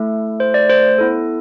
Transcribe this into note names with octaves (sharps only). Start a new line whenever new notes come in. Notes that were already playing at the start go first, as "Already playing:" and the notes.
Already playing: A3 E4 A4
C5
D5
C5
B3 E4 A4